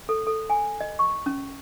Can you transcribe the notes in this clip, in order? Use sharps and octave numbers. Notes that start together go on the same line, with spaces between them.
A4
A4
G#5
D#5
C#6
C#4